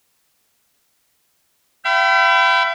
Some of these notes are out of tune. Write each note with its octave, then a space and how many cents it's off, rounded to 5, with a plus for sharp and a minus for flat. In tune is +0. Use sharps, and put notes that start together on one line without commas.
E5 +45 G5 -30 B5 +20